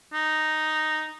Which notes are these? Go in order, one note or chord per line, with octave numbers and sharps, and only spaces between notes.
D#4